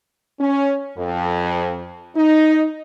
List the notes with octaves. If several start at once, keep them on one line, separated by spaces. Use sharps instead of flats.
C#4
F2
D#4